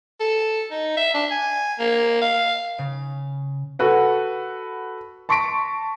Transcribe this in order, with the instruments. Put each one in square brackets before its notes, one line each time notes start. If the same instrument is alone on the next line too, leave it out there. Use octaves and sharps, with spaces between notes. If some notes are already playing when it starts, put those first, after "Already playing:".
[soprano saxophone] A4
D#4
E5
D4
G#5
A#3
F5
[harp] C#3
[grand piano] F#4 A4 B4 F#5
A5 C6 C#6 A#6 B6 D7